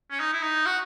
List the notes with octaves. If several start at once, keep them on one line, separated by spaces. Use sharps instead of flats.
C#4
D#4
E4
D#4
F#4